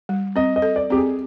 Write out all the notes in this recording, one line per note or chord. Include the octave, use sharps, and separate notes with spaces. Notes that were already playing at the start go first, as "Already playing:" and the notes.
G3
C4 D#5
D#5
A4
D5
C4 G4
G#4